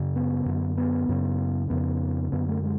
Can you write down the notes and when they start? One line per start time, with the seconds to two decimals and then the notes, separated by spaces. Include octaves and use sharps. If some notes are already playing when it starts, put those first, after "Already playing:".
Already playing: F#2 C#3
0.16 B3
0.46 F#2 D3
0.77 B3
1.09 F#2 C#3
1.70 F2 C#3 B3
2.32 F#2 D3 B3
2.49 A3
2.64 G#3